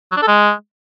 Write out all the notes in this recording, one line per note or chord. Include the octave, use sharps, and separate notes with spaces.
F#3
D4
A4
G#3